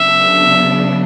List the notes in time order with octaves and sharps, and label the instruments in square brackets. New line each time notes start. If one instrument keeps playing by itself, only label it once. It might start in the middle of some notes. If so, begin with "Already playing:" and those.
Already playing: [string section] C#3 F#3 B3 D4 [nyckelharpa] E5